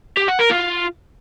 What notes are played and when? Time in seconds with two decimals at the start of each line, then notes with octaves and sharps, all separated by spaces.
0.17 G4
0.28 F#5
0.40 A#4
0.51 F4